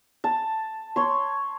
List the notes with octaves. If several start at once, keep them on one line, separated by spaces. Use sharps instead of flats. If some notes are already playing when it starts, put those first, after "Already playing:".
A5
C#5 C6